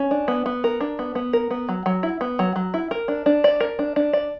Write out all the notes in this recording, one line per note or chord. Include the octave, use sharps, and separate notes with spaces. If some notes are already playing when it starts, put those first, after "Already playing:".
Already playing: C#4
D4
B3
B3
A#4
D4
B3
B3
A#4
B3
F#3
F#3
E4
B3
F#3
F#3
E4
A#4
D4
D4
D5
A#4
D4
D4
D5